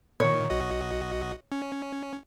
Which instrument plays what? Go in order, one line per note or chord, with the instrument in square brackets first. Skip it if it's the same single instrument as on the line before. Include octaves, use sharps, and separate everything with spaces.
[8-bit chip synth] A#2 D#3 [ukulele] C#5
[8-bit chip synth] B1 F#4 D#5
C#4